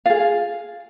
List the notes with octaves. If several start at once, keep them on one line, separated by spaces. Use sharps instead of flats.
F4 G#4 F5